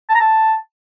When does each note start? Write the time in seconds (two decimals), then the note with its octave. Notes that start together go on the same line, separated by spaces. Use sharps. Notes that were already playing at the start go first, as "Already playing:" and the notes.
0.09 A5
0.15 A#5
0.20 A5